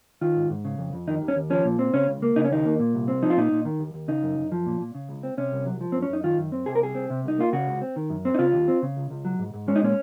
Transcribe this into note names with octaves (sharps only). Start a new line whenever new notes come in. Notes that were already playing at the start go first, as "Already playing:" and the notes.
D#3 F4
G#2
G#2
C#3
F2
F2
D#3 D#4
D#2
C#4
D#2
F3 C#4
A#2
C4
C#3 C#4
C#2
A#3
C#3 D#4
C#4
D#2 D#4
A#3
A#2
C2
C4
F3 D#4
F4
A#2 D#4
A#2
D#3
D#2
D#2
C#3 D#4
F#2
F#2
F3
A#2
A#2
C#3
C#2
C4
C3 C#4
C2
F#3
F3
F#2 C4
C#4
F#2 D#4
D#3 F4
F#2
C4
C3 G#4
A#4
C2 G#4
C4
C3
C2 D#4
A#3 F4
C#3 F#4
C#2
C4
D#3
F#2
C4
D#4
C#3 F4
D#2
C4
C#3
C#2
C#2
F#3
G#2
G#2
G#3 C#4
D#4
A#2 C#4